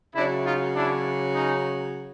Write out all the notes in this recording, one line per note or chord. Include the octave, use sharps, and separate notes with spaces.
C#3 F#3 D4 E4
D#4 F4
D4 E4
C#4 D#4